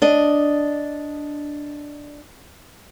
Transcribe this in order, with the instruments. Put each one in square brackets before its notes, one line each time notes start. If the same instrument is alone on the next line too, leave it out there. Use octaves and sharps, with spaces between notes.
[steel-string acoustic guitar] D4 D#5